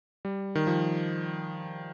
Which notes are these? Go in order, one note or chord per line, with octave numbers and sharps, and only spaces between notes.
G3
D#3
F3